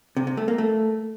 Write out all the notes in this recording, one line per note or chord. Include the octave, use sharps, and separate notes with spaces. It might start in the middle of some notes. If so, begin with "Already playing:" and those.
C3
C3
A3
A#3
A3